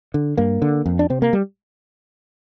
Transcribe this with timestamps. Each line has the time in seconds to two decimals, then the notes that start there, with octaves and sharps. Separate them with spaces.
0.14 D3
0.38 G2 A#3
0.62 D3
0.86 F2
0.99 D4
1.10 C3 C4
1.22 A#3
1.33 G3